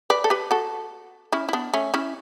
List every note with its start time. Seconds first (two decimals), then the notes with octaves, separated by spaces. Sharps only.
0.10 B4 D5
0.24 A4
0.30 G4 B4
0.51 F#4 A4
1.32 C#4 E4
1.49 E4
1.53 B3 D4
1.74 A3 C#4
1.94 C#4 E4